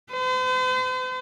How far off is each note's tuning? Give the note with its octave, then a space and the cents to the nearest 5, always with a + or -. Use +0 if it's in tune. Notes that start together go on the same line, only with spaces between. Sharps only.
C5 -45